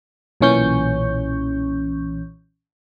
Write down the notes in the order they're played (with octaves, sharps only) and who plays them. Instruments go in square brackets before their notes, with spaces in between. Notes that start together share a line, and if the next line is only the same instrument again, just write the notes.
[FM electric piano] B1 A#2 E3 C#4 C#6 G6